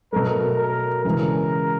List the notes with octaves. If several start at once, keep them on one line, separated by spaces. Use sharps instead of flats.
B2 F#3 A3 A#4
A#4
C#3 E3 G#3 A#4